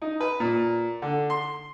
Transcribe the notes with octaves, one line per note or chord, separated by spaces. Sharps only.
D#4
B4
A#2
D3
C6